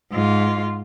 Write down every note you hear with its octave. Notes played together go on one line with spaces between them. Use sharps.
G#2 F4